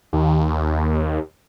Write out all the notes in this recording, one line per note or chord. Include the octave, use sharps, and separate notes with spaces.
D#2